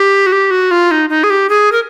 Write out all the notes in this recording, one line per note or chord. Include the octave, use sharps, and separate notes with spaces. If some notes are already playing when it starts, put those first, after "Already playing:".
Already playing: G4
F#4
G4
F#4
F4
D#4
D#4
G#4
G4
G#4
A#4